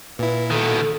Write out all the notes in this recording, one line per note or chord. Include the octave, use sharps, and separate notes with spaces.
A#2 E4 B4
B2 D#3 A4